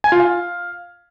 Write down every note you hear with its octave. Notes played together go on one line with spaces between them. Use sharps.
G#5
F4
F5